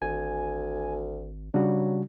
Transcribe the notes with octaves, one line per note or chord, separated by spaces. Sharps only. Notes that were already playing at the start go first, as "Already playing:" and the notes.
G#1 D2 G#5
C#3 F#3 G3 D4 F#4